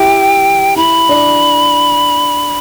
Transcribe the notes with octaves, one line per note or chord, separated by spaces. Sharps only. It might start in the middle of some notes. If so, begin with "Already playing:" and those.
Already playing: E4 G4 G5
E4 B5
D4